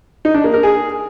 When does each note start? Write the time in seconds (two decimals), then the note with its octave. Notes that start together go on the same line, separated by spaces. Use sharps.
0.25 D#4
0.34 D4
0.44 A#3
0.54 A#4
0.63 G#4